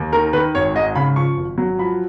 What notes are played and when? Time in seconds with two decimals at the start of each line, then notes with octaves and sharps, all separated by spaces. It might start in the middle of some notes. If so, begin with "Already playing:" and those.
Already playing: D#2
0.13 D#3 A#4
0.33 D#3 B4
0.55 G#1 C#5
0.74 G#2 D#5
0.95 C#3 B5
1.16 F3 C#6
1.37 G#1
1.58 F#3
1.79 F3 B5